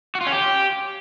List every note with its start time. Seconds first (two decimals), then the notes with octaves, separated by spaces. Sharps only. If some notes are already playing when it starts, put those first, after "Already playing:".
0.15 F#4
0.21 F4
0.27 C#4
0.32 G4